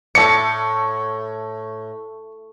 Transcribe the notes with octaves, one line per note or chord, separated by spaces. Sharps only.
A2 A4 D5 C#7